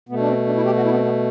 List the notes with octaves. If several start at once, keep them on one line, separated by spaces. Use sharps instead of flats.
B2 A3 B3
D4
C4
D4
E4
G4
F#4
E4
B3
C4
B3